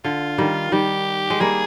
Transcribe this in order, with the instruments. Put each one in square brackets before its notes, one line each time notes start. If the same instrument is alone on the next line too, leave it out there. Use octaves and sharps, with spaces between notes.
[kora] D3 [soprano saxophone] F4
[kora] D#3 G3
[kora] D#3 G3 [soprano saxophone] G4
[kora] G#3
[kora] G3 A#3 [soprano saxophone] G#4